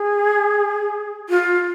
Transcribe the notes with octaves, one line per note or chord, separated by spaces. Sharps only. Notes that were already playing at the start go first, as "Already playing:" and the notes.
Already playing: G#4
F4